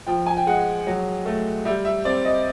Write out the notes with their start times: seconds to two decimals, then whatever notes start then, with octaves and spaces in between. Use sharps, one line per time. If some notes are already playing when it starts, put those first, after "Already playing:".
0.07 F3 G5
0.26 G#5
0.37 G5
0.47 G#3 F#5
0.87 F#3
1.26 A3
1.65 G3 E5
1.85 E5
2.05 C4 D5
2.25 D#5